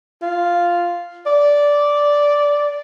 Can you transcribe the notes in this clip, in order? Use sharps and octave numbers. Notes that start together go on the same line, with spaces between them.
F4
D5